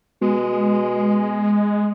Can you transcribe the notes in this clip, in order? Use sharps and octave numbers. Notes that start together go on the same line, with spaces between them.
B2 G#3